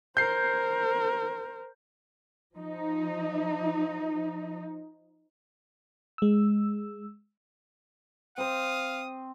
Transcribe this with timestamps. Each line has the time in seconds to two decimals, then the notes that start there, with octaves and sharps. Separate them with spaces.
0.17 A#4 C5 G6 C7
2.56 F3 D#4
6.18 G#3 E6
8.38 C4 C5 F5 D#6